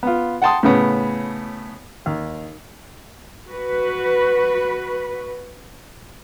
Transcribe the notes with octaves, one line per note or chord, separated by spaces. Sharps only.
B3 F4
F#5 G5 A5 C6 D#6
A2 C#3 B3
D#2
F#4 B4